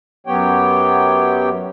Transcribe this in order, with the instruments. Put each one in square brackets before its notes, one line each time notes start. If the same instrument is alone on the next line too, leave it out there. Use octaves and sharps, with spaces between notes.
[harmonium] F#2 F#3 B3 G4 C#5 G5